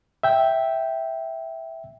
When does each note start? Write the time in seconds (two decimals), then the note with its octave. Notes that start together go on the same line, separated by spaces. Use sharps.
0.23 E5 G5